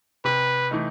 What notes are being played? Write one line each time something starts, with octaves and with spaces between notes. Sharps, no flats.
C3 B4
E3 A3 D#4